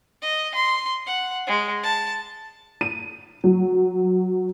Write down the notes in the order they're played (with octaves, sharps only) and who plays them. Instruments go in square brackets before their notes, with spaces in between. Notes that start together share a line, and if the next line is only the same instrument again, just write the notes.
[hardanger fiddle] D#5
C6
F#5
G#3
A5
[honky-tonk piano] D#7
F#3